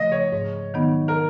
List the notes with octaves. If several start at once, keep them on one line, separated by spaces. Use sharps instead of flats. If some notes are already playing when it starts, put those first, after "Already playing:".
Already playing: C#3 F3 A3 D#5
C#5
G#2
D#3 F#3 B3 D#4
A#4